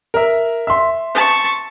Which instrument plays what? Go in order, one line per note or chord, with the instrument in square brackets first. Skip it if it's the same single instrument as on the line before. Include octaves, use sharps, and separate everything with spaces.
[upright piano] A#4 E5
E5 C6
[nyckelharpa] A5 C#6